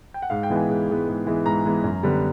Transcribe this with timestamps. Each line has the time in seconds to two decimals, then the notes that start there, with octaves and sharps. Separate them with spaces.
0.14 G5
0.22 F#5
0.30 G#2 F5
0.43 G5
0.50 E3 G#3 B3
0.56 G#5
0.69 G#2
0.89 E3 G#3 B3
1.07 G#2
1.27 E3 G#3 B3
1.45 G#2 A#5
1.65 E3 G#3 B3
1.84 F#2
2.03 D3 G3 B3